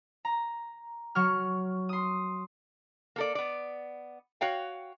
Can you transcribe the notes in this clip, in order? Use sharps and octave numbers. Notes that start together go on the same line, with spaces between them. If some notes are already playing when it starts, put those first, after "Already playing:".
A#5
F#3 C#6 F6
C6 D#6
A#3 A4 D5
B3 D5
F#4 C#5 F5 G5